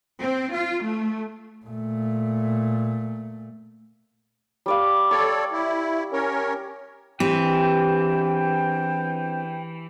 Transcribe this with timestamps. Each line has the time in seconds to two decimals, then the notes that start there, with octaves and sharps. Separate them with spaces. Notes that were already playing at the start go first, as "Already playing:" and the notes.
0.21 C4
0.53 F4
0.83 A3
1.66 A#2 A3
4.66 G3 D5 F5
5.11 A4 C#5 D5 C#6
5.52 E4
6.13 C#4 A#4 C#5
7.20 E2 E3 C4 D4 G4 G5